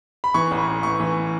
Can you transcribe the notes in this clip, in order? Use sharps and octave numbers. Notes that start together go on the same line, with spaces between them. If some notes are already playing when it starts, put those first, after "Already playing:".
B5
E3 C#6
A1
A1
A2 C#6
E3